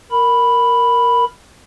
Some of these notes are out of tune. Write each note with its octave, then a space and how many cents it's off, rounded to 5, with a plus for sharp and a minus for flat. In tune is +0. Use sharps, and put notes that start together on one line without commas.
A#4 +0 B5 +0